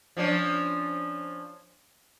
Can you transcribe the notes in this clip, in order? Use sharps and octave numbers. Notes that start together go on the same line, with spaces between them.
F3 C#4 D4